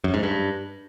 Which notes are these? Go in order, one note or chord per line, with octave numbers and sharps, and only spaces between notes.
F#2
G#2
G2